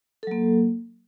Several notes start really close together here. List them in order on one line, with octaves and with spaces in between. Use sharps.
A4 F#3 A#3